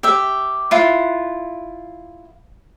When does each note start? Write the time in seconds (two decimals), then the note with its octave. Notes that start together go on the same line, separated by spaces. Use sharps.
0.03 G4 E5
0.71 E4 F4 F#5